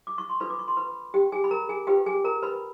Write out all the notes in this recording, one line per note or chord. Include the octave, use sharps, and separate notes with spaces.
D6
C#6
C6
D4 F4 A4 B4 B5
D6
C#6
C6
B4 B5
G4 G5
G#4 G#5
B5
A#4 A#5
G#4 G#5
F4 G4 G#4 B4 G5
G#4 G#5
A#4 A#5
B4 B5